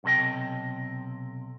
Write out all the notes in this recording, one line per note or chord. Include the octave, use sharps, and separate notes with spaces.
B1 C3 A4 D#5 G5